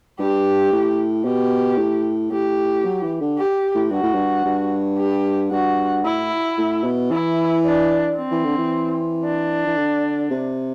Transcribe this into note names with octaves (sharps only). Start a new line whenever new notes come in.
G2 G4
A2
B2 G4
A2
A2 G4
F#3
E3
D3
G4
A2
G2 F#4
A2
G2
G2
G4
G2 F#4
A2 E4
A2
B2
E3 E4
D4
C4
E3
D3
E3
D4
E3
D3
C3